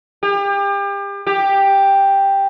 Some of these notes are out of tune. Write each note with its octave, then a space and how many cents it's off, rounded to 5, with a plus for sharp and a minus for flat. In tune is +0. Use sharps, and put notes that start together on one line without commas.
G4 +35
G4 +5